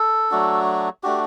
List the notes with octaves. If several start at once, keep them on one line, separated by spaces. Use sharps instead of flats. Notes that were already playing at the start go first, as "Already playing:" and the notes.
Already playing: A4
F#3 A3 D4 F#4
A3 D4 F#4 G4